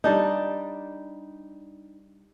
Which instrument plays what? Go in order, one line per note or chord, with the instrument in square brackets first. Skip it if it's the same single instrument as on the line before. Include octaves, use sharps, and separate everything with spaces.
[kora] G3 D4 D#4